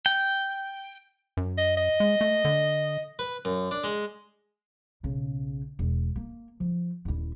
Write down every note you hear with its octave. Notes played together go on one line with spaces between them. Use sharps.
G5
F#2
D#5
D#5
G#3
A3
D3
B4
F#2
D4
G#3
B1 C#3
E1
A#3
F3
D#1 E4